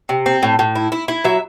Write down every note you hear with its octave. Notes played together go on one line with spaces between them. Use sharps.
C3
C4
A2
A2
E4
E4
E4
F#3 E5